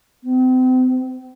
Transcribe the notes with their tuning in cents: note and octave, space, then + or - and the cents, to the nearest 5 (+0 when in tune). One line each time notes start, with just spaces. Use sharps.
C4 -40